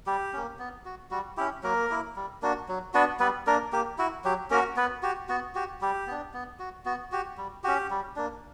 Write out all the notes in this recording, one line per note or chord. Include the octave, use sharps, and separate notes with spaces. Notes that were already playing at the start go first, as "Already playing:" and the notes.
G3 G4
A#3 C#4
B3
F#4
G3 F#4
C#4 E4 G4
F#3 A#3 A#4
A#3 E4
G3
A#3 D4 F#4
F#3
B3 D4 F#4 B4
G3 B3 B4
A#3 D4 A#4
A#3 G4
E4 F#4
F#3 G4
A#3 C#4 F#4 A#4
B3 B4
F#4 G4
B3 F#4
F#4 G4
G3 G4
B3 D4
B3
F#4
B3 F#4
F#4 G4
G3
C#4 F#4 G4
G3
A#3 D4